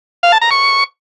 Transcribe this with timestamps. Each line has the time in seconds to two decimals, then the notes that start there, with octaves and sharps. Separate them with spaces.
0.23 F5
0.32 A5
0.41 A#5
0.51 C#6